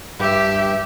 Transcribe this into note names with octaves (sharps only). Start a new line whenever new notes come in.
G2 G4 E5